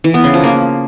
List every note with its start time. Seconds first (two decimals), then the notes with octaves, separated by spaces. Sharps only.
0.04 E3
0.14 B3
0.24 C#3
0.34 F3
0.44 A#3